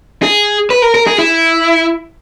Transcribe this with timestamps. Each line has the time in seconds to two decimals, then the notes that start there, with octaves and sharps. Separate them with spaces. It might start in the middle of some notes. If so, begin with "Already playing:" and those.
0.23 G#4
0.70 B4
0.82 A#4
0.95 A#4
1.07 G#4
1.18 E4